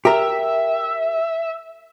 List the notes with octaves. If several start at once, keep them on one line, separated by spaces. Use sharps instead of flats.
G4 A#4 E5